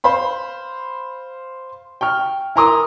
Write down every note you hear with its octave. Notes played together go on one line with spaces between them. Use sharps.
C5 F5 B5 C6
G5 C#6 F6
E4 A#4 A#5 C6 D6 D#6